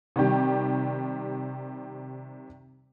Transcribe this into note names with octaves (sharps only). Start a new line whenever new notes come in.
C3 D#3 G3 G4